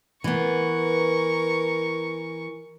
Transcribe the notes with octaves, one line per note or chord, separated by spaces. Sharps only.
E3 B3 A#4 C#6